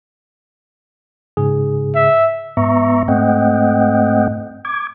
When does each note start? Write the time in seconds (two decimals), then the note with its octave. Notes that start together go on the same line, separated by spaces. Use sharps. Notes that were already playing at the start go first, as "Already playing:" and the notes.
1.37 G#2 C#3 G#4
1.95 E5
2.57 G#2 B3 E5 A#5 C#6
3.08 G#2 A3 C4 D#5 F#5 G5
4.65 D6 G#6